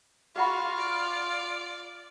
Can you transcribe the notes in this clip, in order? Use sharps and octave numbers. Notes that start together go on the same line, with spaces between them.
F4 F#4 G#4 F#5 B5 F6
D5